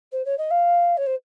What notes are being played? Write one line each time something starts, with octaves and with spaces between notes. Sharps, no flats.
C5
C#5
D#5
F5
C#5
C5